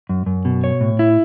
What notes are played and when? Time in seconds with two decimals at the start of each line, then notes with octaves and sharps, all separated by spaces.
0.09 F#2
0.26 F#2
0.45 B2
0.64 C#5
0.81 A2
0.99 E4